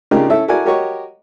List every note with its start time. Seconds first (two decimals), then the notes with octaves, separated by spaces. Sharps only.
0.11 C#3 D4 D#4 F4 G4 A#4
0.30 C#4 E4 A4 E5
0.48 E4 F#4 A4 A#4 D5 G#5
0.66 F#4 G4 A#4 C#5 D#5 C#6